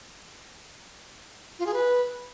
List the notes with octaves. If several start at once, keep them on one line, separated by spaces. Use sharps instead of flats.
F4
G#4
B4